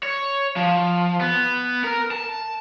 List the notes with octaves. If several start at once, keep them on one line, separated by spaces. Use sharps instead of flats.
C#5
F3
B3
A#4
A5